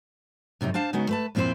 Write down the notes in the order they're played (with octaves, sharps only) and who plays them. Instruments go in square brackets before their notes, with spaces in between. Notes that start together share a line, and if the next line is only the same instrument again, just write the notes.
[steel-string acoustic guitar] F#2 C3 D4 D#4
D4 C5 F5 A5
C#3 G#3 B3 D#4 F#4
A3 B4 A5
F2 A#2 C4 E4 C5